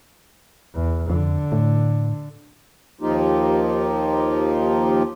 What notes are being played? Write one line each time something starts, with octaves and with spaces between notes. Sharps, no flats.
E2
F2 D3
A2
D#2 F3 A#3 D#4 F4 G4